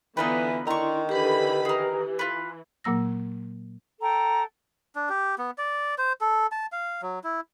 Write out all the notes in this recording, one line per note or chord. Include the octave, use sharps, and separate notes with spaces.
D3 E3 B3 D#4 F4 B4
D#3 D4 E4 A#5 C6 C#6
D3 E3 G4 B4 B5
E3 G#4 A#4
F4 B4
A#2 F#3 A#3 E6 A#6
A4 G5 A#5
D4
G4
B3
D5
C5
A4
A5
F5
F#3
E4